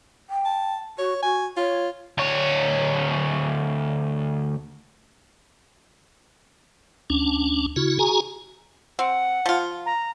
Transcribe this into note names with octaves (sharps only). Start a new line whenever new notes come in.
G5
A5
F#4 C#5
F#4 G#5
F4 C#5
D2 C#5
D2 C#4 D4
C#3 E4 F#4
F#4 G#4 G#5 A#5
C4 F#5
F3 F4
A#5